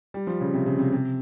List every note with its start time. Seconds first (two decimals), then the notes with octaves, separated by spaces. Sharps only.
0.14 G3
0.27 F3
0.40 C#3
0.54 C3
0.66 C#3
0.79 C3
0.92 C3